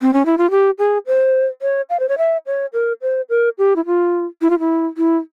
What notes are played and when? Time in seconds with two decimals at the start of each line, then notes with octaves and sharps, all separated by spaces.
0.01 C4
0.13 C#4
0.25 E4
0.38 F4
0.51 G4
0.79 G#4
1.06 C5
1.62 C#5
1.90 F5
1.99 C5
2.09 C#5
2.18 E5
2.46 C#5
2.73 A#4
3.02 C5
3.29 A#4
3.58 G4
3.76 E4
3.86 F4
4.41 E4
4.50 F4
4.59 E4
4.97 E4